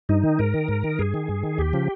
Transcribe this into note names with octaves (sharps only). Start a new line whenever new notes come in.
G2 D#4
D#3
G#2 A#4
D#3
G#2
D#3
G2 G#4
D#3
G2
D#3
D#2 G4
C#3 F3